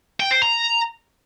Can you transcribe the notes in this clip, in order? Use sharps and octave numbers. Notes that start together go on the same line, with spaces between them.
G5
C5
A#5